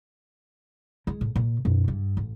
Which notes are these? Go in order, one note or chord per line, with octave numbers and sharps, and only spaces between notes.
G#3
A2
A#2
F#2 B2
G2
A1